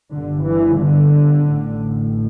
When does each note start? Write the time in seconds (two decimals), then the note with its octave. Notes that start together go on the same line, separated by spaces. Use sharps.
0.13 G1 G2 D3
0.46 E3
0.80 D3
1.48 A1 A2